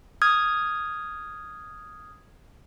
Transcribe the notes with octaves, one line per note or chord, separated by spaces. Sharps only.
D#6 F6 G#6